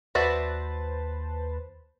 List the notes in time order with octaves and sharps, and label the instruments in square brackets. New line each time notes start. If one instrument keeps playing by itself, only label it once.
[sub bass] D#2 [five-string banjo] F#4 D5 E5 [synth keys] B4 C5 A5